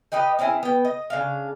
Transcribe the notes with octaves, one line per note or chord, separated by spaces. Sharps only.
D#4 G4 B4 D#5
C4 C#4 E4 G#4
B3 G5
D#5
C#3 D4 F5